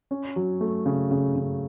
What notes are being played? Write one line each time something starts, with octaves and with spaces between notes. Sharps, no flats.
C#4
F#3
A3
C#3
C#3
C#3